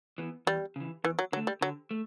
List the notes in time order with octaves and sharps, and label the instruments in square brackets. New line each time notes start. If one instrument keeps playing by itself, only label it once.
[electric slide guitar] E3 B3
[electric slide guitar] E2 [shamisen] G3
[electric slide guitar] C#3 E3
[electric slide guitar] E2 [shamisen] E3
[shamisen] F#3
[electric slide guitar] D3 [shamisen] F#3
[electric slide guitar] A3
[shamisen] G3
[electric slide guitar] D3 [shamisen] F#3
[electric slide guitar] A3